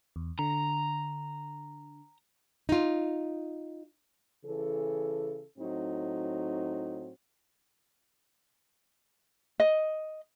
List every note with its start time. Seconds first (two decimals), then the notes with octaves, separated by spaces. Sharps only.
0.16 E2
0.39 D3 A#5
2.69 D#4 F4
4.45 C#3 E3 A4
5.58 A2 F#3 C4 D#4
9.60 D#5